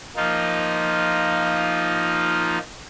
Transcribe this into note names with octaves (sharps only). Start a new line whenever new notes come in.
F3 A#3 D#4 F4